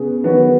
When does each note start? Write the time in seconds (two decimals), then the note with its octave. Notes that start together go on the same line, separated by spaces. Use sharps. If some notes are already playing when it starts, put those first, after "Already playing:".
Already playing: C#3 B3 G#4
0.24 D#3 F#3 B3 F#4 B4